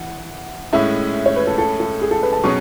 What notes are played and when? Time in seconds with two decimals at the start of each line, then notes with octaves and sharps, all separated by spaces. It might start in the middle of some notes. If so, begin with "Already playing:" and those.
Already playing: E3 F#5
0.73 A2 G#3 C#4 E4 E5
1.26 C#5
1.36 B4
1.47 A4
1.58 A4
1.80 A4
2.02 G#4
2.11 A4
2.23 B4
2.33 A5
2.44 B2 F#3 C#4 G#4 C#6